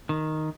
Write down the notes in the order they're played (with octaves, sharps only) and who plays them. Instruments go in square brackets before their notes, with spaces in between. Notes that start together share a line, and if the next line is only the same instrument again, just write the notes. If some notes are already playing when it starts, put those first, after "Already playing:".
[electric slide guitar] D#3